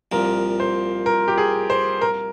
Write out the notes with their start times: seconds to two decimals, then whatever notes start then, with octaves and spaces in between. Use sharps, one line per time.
0.12 C2 A#2 F3 A#4
0.60 C5
1.06 A#4
1.28 G4
1.38 G#4
1.70 C5
2.01 A#4